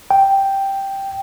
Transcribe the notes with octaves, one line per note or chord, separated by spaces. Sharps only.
G5